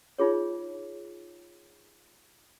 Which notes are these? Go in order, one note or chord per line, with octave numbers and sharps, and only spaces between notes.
D#4 F4 G#4 C#5